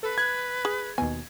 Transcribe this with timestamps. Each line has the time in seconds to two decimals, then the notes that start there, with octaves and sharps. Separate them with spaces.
0.03 A4 B4
0.18 F#6 G#6
0.65 G#4
0.98 D#2 B2 G#5